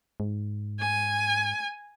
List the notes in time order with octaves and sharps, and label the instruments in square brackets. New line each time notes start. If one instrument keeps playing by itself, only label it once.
[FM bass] G#2
[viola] G#5